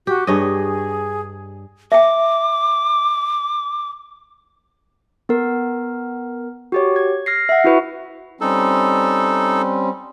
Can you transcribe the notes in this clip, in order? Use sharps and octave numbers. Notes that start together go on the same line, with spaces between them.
F#4 G4
G2 G#4 C#5 D#5
E5 G5 D6
B3 A#4
F#4 G4 C#5
G#6
F6 A#6 C7
E5 F#5
E4 F#4 B4
G3 C4 C#4 D#4 A4